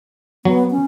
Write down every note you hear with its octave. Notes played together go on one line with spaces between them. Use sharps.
F#3 B3
C#4